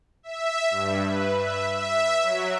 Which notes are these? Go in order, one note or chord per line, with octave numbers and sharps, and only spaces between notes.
E5
G2
B4
E5
E5
F#3